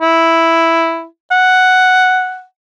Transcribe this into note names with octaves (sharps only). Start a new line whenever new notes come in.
E4
F#5